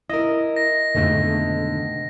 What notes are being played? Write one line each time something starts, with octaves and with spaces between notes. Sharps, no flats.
E4 A#4 D#5
A#6
F2 G#2 B2 D3 D#3 A3